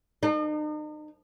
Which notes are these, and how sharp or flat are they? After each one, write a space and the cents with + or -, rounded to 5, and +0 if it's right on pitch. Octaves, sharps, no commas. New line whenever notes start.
D#4 -40